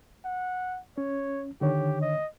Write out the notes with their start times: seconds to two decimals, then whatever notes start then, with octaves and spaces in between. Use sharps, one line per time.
0.25 F#5
0.98 C#4 C#5
1.61 D3 D#3 G4 C#5
2.01 D#5